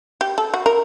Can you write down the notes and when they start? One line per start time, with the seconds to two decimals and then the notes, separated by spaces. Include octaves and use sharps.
0.21 G4
0.38 A4
0.54 F#4
0.66 A#4